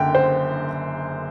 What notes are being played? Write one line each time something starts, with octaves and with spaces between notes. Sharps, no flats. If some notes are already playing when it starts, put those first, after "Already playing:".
Already playing: F#1 F#2 D3 G5
C5